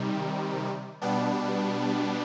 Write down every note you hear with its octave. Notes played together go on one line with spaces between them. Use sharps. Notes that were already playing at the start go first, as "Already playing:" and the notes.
Already playing: C3 D#3 G3
B2 G3 B3 D4